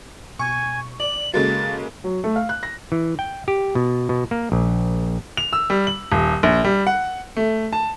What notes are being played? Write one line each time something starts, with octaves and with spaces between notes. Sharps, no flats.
B2 G#5 C#6
D5 F#7
C#3 G#3 A#3 F#4 A4 A5 A6
F#3
A3
F5
F#6
A#6
E3
G5
G4
B2
B2
A#3
A#1
F7
E6
G3
F#7
D#1
A#1
G3
F#5
A3
A5